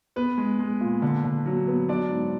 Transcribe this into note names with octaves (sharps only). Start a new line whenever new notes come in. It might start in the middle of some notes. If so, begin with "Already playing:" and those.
B3 B4
G#3
G#3
A#2
D3
D3
F#3
B3
F#3 D4 D5
G#2